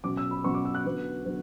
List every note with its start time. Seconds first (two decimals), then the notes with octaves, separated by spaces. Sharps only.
0.04 B2 F#3 C#4 D6
0.17 E6
0.31 B5
0.44 B2 F#3 C#4 C#6
0.54 D6
0.65 E6
0.75 F#6
0.84 D3 F#3 B3
1.25 D3 F#3 B3